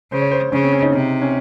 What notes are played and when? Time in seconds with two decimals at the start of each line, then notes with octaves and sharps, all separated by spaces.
0.12 C#3 C5
0.22 C#5
0.31 C5
0.52 C#3 C#4
0.63 C4
0.73 C#4
0.82 D#4
0.93 C3 D#4
1.22 C#4